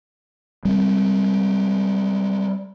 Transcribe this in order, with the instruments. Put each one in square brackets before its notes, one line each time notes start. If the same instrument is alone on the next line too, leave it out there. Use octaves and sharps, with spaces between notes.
[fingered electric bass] G3 G#3 C4